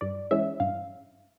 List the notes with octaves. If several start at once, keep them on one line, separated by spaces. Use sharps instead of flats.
G2 D5
E3 G#3 C#4 E4 E5
G2 F5